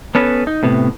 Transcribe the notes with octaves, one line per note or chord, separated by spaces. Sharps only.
B3 C#4 A4 B4
D#4
A2 C3 B3